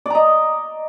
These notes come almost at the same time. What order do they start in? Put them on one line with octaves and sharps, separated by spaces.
D5 A#5 D#5